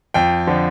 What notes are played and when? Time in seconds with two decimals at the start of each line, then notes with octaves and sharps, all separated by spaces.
0.14 F2 G5
0.47 D3 F3